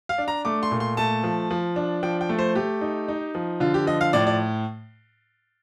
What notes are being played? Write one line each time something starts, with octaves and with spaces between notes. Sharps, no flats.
F5
D4
A#5
A3 D6
C6
A#2
C6
A3 A5
F3
F3
D4
F3 G5
G5
A3
C5
A3 G4
D#4
D#4
F3
D3 F4
G4
F3 D#5
F5
A2 D5
D5